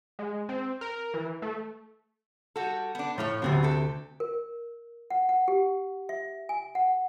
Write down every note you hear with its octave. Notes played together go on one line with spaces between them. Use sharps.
G#3
C4
A#4
E3
A3
G3 F#4 A4
B3 D4
A2 F3 A3 C#5
D2 C3 F#3 B3 C4
G4 A4
A#4
F#5
F#5
G4
E5
G#5
F#5